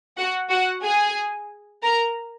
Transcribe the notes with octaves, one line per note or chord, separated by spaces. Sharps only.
F#4 F#5
F#4 F#5
G#4 G#5
A#4 A#5